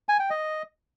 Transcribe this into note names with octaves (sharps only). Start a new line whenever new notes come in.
G#5
G5
D#5